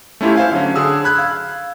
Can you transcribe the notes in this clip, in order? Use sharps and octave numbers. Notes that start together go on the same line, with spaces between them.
A3 C#4 E4 F4 G4
C5 F5 G#5
D3 F#3 C#4
D3 G#4 E6
B5 F#6 G#6
F5